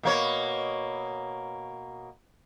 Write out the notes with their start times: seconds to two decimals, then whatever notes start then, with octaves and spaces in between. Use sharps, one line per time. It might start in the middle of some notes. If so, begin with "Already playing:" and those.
0.03 B2 A#3 C#5